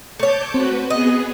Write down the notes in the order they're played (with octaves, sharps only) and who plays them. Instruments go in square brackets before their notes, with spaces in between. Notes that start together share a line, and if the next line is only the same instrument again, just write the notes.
[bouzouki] A3 C#5 [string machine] A5 D6 G6
[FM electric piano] C4 [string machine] F#4 B4
[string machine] B3 G#4 [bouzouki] D#5